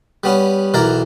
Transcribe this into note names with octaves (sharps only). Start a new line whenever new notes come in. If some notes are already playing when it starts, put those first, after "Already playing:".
G3 B3 C#4
B1 E3 A#4 D5